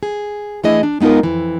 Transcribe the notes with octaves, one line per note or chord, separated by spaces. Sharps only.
G#4
E3 A3 D4 E4 G#4 D#5
D4
G#3 B3 D#4 F4 A#4
F2 E3